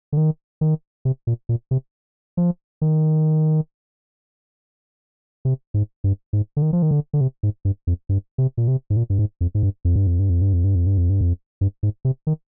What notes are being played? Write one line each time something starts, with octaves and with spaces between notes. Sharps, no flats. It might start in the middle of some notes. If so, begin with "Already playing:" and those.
D3
D#3
D#3
C3
A#2
A#2
C3
F3
D#3
C3
G#2
G2
G#2
D3
D#3
F3
D#3
D3
D3
C3
G#2
G2
F2
G2
C3
A#2
C3
G#2
A#2
G2
G#2
F2
G#2
G2
F2
G2
F2
G2
F2
G2
F2
G2
F2
G2
F2
G2
F2
G2
G#2
C3
D#3